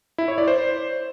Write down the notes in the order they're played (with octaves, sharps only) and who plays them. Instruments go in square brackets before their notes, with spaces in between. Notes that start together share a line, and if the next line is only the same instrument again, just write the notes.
[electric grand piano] E4
C#5
D5
C5